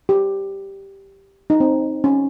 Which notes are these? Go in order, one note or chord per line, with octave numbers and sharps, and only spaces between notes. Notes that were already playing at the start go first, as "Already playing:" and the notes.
G4
D#4
C4
C#4